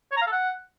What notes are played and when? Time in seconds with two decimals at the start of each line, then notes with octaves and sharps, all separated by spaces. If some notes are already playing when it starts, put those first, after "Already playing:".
0.12 C#5
0.17 A#5
0.22 F5
0.27 A4
0.32 F#5